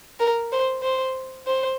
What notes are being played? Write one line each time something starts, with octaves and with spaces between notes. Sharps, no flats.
A#4
C5
C5
C5